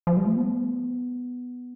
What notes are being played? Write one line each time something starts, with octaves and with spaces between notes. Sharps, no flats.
F3
G3
A3
B3